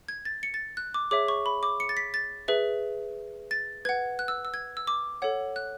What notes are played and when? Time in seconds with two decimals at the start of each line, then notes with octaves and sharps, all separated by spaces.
0.09 G#6
0.25 A6
0.43 C#7
0.54 A6
0.77 F#6
0.94 D6
1.11 G#4 C#5 E5 D6
1.28 C#6
1.46 B5
1.63 D6
1.80 C#7
1.89 A6
1.97 B6
2.14 A6
2.48 G#4 B4 E5
3.51 A6
3.85 B4 F#5 G#6
4.19 F#6
4.28 E6
4.45 E6
4.54 G#6
4.77 E6
4.87 D6
5.22 A4 C#5 F#5
5.56 F#6